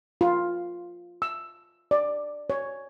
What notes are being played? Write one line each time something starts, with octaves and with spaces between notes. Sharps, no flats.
F4
E6
D5
C#5